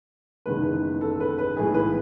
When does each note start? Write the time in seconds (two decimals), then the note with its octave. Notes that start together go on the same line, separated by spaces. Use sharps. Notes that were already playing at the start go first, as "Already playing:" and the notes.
0.46 F#1 E2 D#3 G#3 B4
1.01 A4
1.20 B4
1.38 B4
1.56 B1 A2 E3 G#3 G#4
1.74 B4